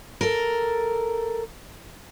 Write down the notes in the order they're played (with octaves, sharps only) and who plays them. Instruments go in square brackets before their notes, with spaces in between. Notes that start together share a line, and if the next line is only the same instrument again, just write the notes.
[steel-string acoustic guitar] A4 A#4